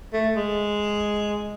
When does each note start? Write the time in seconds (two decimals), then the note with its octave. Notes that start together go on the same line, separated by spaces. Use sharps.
0.13 A3
0.36 G#3